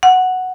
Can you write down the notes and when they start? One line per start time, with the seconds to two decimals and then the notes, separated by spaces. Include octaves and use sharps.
0.03 F#5